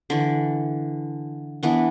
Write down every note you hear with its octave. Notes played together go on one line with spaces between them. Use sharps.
D3 E3
E3 B3 D4